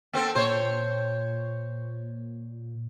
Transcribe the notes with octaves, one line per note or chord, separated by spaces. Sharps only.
A#3 C4 A4
A#2 C5 C#5